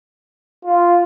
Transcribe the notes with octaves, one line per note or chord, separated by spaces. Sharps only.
F4